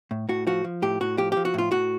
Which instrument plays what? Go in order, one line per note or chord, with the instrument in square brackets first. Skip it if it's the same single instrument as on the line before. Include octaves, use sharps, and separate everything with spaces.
[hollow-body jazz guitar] A2
A2 F#4
F3 F#4
F3
A2 G4
A2 F#4
F3 G4
F3 G4
F#4
A2 F4
A2 F#4